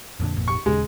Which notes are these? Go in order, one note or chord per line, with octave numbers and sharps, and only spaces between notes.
F2 A#2 D3
G#1 F2 A#2
C#6
D#1 C#3 G#3